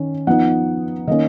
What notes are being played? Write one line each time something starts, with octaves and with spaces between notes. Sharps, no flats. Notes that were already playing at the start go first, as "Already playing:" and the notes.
Already playing: D#3 C#4
F3 B3 D#4 F#5
D#3 A#3 C#4 D#5